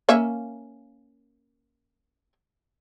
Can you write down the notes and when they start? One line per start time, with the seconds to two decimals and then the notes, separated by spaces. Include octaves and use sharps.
0.09 A#3 C#4 E5